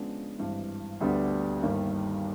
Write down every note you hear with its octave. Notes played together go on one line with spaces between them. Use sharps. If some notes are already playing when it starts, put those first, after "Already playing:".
Already playing: C#3 F3 G#3 B3 D4
G#1 G2 E3
D2 D3 G3 B3 D4
G1 G2 D#3 G3 A#3